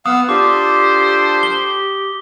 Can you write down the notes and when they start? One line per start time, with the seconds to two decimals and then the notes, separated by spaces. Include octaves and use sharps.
0.06 B3 F5 F#5 D#6 E6
0.29 D4 F4 G4 A4 C5 D6
1.43 G7